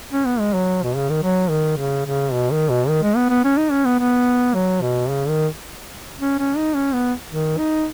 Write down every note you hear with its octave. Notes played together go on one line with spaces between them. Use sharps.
C#4
B3
G#3
F#3
B2
C#3
D#3
F#3
D#3
C#3
C#3
B2
D#3
B2
D#3
G#3
B3
B3
C#4
D#4
C#4
B3
B3
F#3
B2
C#3
D#3
C#4
C#4
D#4
C#4
B3
D#3
D#4